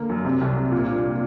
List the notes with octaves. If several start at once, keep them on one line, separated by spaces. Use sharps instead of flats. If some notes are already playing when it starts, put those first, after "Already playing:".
Already playing: D3 A#3
F#2
C3
C2
C2
A#2
D4